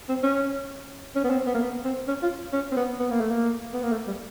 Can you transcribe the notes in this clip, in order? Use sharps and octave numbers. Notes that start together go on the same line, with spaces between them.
C4
C#4
C#4
B3
C4
B3
A#3
B3
C4
C#4
F4
C#4
C4
B3
B3
A#3
A3
A#3
B3
A#3
A3
G3